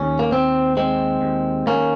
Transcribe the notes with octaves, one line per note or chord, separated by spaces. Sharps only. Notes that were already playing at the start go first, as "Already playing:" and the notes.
Already playing: D#2 C#4
A#3
D#2 C4
G#3 C4
D#2
D#2 A#3 C#4